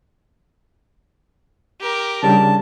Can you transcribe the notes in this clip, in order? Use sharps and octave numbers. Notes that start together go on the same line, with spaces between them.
G4 A#4
C#3 G3 D4 A5